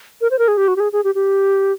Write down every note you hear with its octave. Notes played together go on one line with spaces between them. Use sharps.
A#4
C5
A#4
G#4
G4
F#4
G4
G#4
G#4
G4
G4